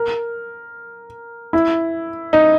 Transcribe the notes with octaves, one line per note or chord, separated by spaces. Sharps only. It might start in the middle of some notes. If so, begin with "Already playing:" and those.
Already playing: A#4
E4
D#4